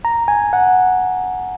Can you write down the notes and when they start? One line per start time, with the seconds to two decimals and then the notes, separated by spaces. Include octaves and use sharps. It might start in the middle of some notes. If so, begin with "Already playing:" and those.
0.05 A#5
0.28 G#5
0.53 F#5